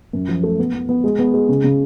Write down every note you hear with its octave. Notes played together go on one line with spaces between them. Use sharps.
F#2
F3
A3
B3
B3
B3
G#3
B3
G#3
C#3
C#3